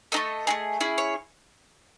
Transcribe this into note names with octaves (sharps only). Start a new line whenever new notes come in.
A3 D#4 A4 D#5
A3 D#4 G#4
C#4 E4 G#4
C#5